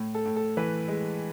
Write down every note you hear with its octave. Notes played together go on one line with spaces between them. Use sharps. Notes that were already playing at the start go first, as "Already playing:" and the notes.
Already playing: A2
A4
A2
A4
E3 B4
G#3